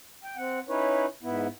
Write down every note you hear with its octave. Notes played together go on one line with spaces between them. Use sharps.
G5
C4 F#5
C#4 D#4 E4 B4 C#5
G#2 B3 E4